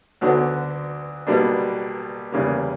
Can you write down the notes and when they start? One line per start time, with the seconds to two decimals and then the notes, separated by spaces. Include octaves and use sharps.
0.21 D2 D3 F#3 B3 F#4
1.27 B1 B2 G3 A#3 D4
2.32 E2 C#3 G3 A#3